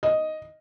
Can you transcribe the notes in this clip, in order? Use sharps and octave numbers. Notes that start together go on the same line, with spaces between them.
D#5